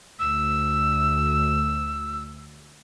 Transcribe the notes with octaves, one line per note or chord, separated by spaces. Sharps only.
D2 E6